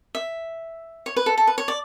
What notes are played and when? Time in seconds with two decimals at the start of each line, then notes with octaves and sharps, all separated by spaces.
0.15 E5
1.06 C#5
1.16 B4
1.26 A4
1.38 A4
1.47 B4
1.58 C#5
1.68 D5